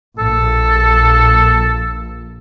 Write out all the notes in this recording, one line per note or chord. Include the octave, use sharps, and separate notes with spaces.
A#1 A4